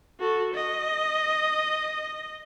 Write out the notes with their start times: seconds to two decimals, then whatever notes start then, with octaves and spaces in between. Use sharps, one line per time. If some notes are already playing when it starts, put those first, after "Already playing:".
0.20 F#4 A4
0.54 D#5